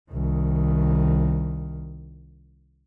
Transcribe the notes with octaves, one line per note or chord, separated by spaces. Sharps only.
C2 D#3